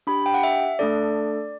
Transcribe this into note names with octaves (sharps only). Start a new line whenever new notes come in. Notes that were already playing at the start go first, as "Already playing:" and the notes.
D4 G4 B5
G5
F#5
E5
A3 D4 A4 D5